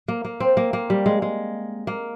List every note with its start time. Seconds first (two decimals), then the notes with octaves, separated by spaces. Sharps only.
0.08 A#3
0.25 A#3
0.40 C4
0.57 A#3
0.73 A#3
0.90 G3
1.06 G#3
1.22 G#3
1.87 A#3